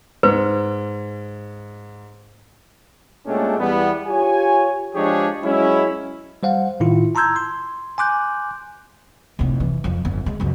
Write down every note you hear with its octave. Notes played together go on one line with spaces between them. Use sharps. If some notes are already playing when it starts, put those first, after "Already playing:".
G#2 B4 C5
A#2 G#3 A3 C#4 D4 G4
E2 G3 B3
F4 G4 C#5 G#5
F3 G#3 D4 G4 G#4 C#5
F#3 G#3 C#4 E4
G3 C5 F5 F#5
A2 D#3 E4 F4
A5 A#5 C6 E6 G6 G#6
C6
G#5 C6 D6 F#6 G6
F1 A2
E3
F2 F3
G1
G#3
C#2 F#2